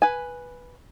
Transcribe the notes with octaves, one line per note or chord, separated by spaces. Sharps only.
B4 G#5